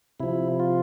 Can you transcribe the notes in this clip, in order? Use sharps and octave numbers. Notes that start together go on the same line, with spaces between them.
C3 F3 E4
F4